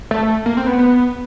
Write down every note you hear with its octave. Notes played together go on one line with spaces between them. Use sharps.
A3
A#3
C4
B3
B3